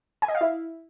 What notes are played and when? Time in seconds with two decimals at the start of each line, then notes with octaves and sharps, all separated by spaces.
0.22 G#5
0.28 D#5
0.35 F5
0.41 E4